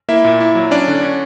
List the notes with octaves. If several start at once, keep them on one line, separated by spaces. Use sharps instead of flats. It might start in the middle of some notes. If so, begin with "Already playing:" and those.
A#3 E4 E5
A#2
E4
F#3
C#4 D4 D5
D3
C#4